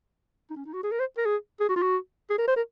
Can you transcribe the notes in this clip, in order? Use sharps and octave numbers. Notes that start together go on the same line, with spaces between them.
D#4
C#4
D#4
F#4
G#4
A#4
C5
A#4
G#4
G#4
F#4
F4
F#4
G#4
A#4
C5
A#4